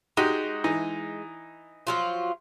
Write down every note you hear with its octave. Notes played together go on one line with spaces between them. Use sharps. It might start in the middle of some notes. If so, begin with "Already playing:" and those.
G#3 D#4 F#4 G4
E3 D#4
F3 F#3 F4